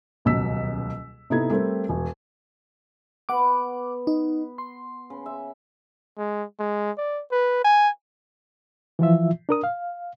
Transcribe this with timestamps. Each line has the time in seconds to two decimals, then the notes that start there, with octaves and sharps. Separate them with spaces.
0.25 D#1 C#2 B2 F#3 E6 B6
1.30 C3 B3 D#4 E4 A4 G#6
1.50 G3 A3 C4 A#4
1.89 E1
3.29 B3 B4 F#5 D6
4.07 D#4
4.58 C6
5.10 C#3
5.26 E5
6.18 G#3
6.59 G#3
6.98 D5
7.32 B4
7.65 G#5
8.99 E3 F3 F4 E5
9.49 D4 A#4 D#6
9.64 F5